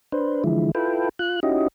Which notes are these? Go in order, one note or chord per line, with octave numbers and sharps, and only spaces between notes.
D4 B4 C5
D3 E3 F3 G#3 E4
E4 F4 A4 B4 G5
F4 F#6
C#4 D#4 E4 F#4 G4 D#5